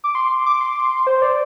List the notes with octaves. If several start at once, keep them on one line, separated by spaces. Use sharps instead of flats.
D6
C6
D6
C6
C5
D5